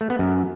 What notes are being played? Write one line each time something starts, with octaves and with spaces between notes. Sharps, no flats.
A3
B3
F#2